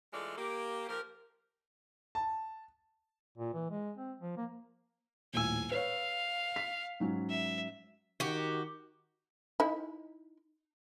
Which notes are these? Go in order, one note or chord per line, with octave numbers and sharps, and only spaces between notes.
E3 G#3 A3 F4 A4 D5
A#3 G4
F3 A#3 G4 A#4
A5
A#2
E3
G#3
C4
F3
A#3
D#1 A2 G#5 E6
B4 C#5 F5
B6
G#2 F#3 C#4
E5
D#3 F#4 G4
D#4 E4